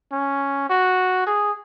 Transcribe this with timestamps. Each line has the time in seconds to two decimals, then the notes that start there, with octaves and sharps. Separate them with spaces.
0.12 C#4
0.70 F#4
1.27 G#4